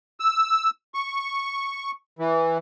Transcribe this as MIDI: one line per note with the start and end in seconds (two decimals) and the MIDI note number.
0.20 0.70 88
0.94 1.91 85
2.19 2.58 52